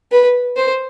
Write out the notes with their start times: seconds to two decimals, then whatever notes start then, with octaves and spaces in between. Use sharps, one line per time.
0.12 B4
0.56 C5